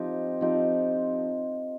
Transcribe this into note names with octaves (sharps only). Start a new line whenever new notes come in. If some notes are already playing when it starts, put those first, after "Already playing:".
Already playing: F3 C4 D#4 G4
F3 C4 D#4 G4